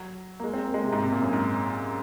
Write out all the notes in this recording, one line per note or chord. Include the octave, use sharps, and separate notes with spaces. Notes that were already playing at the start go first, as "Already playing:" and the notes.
Already playing: F#3
A#3
G#3
C4
A#3
G#3
C3
G#2
C3
A#2
F#2
G#2